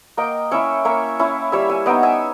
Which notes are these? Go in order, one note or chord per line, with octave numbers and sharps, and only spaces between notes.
A#3 D#5 G5
C#4 E4 C#5 E5
A#3 C#5 E5
C#4 E4
G3 C#5 E5
E5 G#5
B3 D#4 D#5 G5
E5 G#5